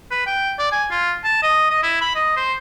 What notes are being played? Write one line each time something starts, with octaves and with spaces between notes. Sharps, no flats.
B4
G5
D5
G#5
F4
A5
D#5
D#5
E4
B5
D#5
C5